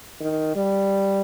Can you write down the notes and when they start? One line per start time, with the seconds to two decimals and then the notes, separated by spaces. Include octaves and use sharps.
0.21 D#3
0.56 G3